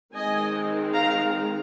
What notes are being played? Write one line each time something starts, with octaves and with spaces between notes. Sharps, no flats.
D#3 G#3 C4 D#5 G#5
F5 A#5